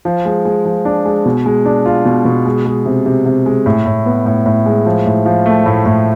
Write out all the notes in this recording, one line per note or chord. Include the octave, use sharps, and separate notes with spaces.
F3
G#3
G#3
F3
D4
G#3
B2
G#3
D4
F4
B2
B2
G#3
G#3
C3
C3
C3
G#3
A2
A2
B3
A2
A2
G#3
F3
A2
F3
A3
A2
A2